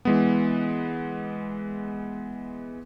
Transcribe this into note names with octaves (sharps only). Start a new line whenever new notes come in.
E3 G#3 B3